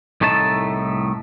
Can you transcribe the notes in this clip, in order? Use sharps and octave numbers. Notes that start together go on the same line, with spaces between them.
C2 A2 A3 D#4 A5